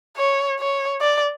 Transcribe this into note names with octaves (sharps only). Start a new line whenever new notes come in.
C#5
C#5
D5